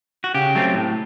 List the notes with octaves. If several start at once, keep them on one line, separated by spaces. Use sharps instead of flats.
F#4
C#3 G4
F#3 A3 C4
A2